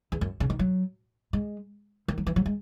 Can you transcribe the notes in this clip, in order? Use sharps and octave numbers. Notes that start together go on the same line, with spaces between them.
E2
F#2
C#3
D#3
F#3
G#3
D#3
F#3
E3
F#3
G#3